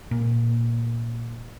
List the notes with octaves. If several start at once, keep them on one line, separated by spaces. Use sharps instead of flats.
A#2